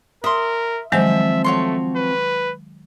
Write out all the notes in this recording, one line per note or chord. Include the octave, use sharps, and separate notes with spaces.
A#4 E5 C6 D#6
D#3 F3 F#3 G#3 C4 E5
A3 F#4 C#5 C6
B4